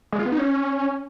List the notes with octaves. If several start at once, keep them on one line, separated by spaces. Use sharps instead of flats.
G#3
F4
B3
D#4
C#4